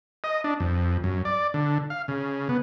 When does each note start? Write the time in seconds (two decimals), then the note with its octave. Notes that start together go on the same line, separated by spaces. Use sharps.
0.24 D#5
0.44 D4
0.60 F2
1.04 F#2
1.25 D5
1.54 D3
1.90 F5
2.08 C#3
2.49 B3